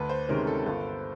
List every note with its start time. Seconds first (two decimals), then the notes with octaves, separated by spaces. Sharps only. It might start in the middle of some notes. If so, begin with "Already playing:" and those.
Already playing: D2 B4
0.09 C5
0.29 C3 D#3 G#3 C#4 A#4
0.47 A4
0.66 G1 A4